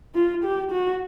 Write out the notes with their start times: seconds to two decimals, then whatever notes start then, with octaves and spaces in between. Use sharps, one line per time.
0.15 F4
0.44 G4
0.71 F#4